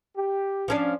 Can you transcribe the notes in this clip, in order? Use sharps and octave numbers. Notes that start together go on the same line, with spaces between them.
G4
F3 C#4 D4